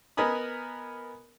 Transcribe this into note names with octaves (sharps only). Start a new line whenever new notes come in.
B3 A#4 D#5 G#5 B5 D#6